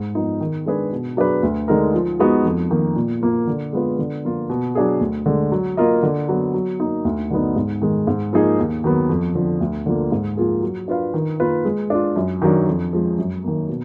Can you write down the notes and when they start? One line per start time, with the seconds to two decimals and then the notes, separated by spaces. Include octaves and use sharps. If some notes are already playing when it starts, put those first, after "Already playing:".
Already playing: G#2
0.15 F3 B3 D#4
0.41 D#3
0.66 G#3 D4 G#4 B4
0.92 B2
1.17 F#3 D4 G#4 B4
1.43 D2
1.68 D3 G#3 D#4 A#4
1.94 F3
2.19 G#3 B3 D#4 F#4
2.45 F2
2.70 D#3 A#3
2.96 A#2
3.21 F3 A#3 F4 A#4
3.47 D3
3.73 G#3 B3 F4 B4
3.99 D3
4.24 F3 A#3 F4
4.49 B2
4.75 F#3 D4 G#4
5.01 D2
5.26 D3 G#3
5.52 F#3
5.77 A#3 F4 A#4 D#5
6.03 D3
6.28 F#3 B3
6.54 F#3
6.80 A#3 D#4
7.05 D2
7.30 D3 F#3 B3 D#4
7.56 G#2
7.82 D#3 G#3
8.07 G#2
8.33 F3 A#3 D#4 G#4
8.59 D#2
8.84 D#3 F#3 B3
9.09 F2
9.35 D3 F3
9.60 D2
9.86 D3 F3 A#3
10.12 G#2
10.37 F3 A#3 F4 G#4
10.63 F#3
10.88 D4 F4 B4 F5
11.14 D#3
11.40 A#3 F4 B4
11.65 G#3
11.90 D4 F4
12.16 F#2
12.42 D#3 F#3 D4
12.67 F2
12.93 F3 G#3
13.18 F#2
13.44 D#3 A#3
13.69 B2